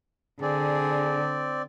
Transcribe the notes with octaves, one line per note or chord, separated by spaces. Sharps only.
D3 C4 G#4 D5